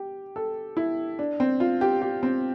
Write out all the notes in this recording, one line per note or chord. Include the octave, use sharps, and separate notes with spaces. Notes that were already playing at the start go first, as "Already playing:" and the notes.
Already playing: G4
A4
E4
D4
C4
F4
G4
G4
C4